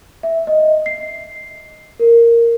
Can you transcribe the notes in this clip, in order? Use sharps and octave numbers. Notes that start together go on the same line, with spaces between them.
E5
D#5
C7
A#4